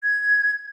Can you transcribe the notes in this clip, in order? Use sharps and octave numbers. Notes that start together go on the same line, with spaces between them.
G#6